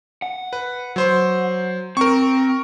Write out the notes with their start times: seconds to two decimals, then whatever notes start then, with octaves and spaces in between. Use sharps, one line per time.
0.22 F#5
0.53 B4
0.96 F#3 C5 C6
1.97 C4 A#4 C#6